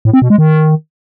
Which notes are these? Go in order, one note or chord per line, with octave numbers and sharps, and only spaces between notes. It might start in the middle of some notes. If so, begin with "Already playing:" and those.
A2
C4
B2
G#3
D#3